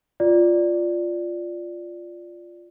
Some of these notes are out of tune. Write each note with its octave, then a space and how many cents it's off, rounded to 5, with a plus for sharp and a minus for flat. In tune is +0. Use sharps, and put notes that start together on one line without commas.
F4 +0 D5 +0